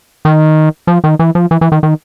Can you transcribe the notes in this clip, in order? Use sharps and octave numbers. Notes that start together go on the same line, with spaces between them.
D#3
F3
D#3
E3
F3
E3
E3
D#3
D#3